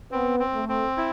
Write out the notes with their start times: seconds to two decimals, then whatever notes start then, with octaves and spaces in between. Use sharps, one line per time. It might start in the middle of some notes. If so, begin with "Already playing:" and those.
0.12 B3 C4
0.40 C4
0.54 A3
0.69 C4
0.97 E4